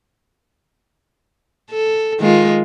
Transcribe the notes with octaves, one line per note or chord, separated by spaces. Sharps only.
A4
D#3 G#3 F4